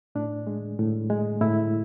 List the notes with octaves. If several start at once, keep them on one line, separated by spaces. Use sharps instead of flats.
A2 D4
G#3
A2
G#3
A2 E4